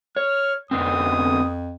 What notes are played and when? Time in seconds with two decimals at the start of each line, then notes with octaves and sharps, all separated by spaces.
0.16 C#5 F6
0.71 F2 D3 B3 C4 D#6